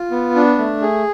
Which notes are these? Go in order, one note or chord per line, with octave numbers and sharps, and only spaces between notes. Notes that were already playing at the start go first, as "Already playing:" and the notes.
Already playing: F4
B3
D4
A3
G#4